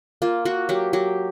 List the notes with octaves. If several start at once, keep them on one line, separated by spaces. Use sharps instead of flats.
A#3 F4
A#3 F#4
F#3 G4
F#3 G4